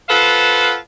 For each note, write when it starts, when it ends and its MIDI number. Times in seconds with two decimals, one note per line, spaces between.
0.09 0.74 65
0.09 0.74 69
0.09 0.74 71
0.09 0.74 72
0.09 0.74 77
0.09 0.74 78